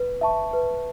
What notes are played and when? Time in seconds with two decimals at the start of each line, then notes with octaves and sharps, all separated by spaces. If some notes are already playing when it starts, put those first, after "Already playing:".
Already playing: B4
0.21 E5 A5 C#6
0.53 B4